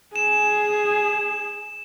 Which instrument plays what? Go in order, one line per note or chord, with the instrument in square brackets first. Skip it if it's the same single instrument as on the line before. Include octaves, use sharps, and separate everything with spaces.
[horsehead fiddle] G#4 [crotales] E7